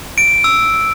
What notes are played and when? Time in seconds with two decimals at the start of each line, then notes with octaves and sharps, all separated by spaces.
0.18 D7
0.44 E6